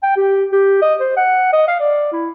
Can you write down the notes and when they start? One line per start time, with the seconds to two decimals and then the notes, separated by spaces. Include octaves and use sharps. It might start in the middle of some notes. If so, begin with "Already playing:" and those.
0.03 G5
0.16 G4
0.52 G4
0.82 D#5
1.00 C5
1.17 F#5
1.53 D#5
1.68 F5
1.80 D5
2.13 E4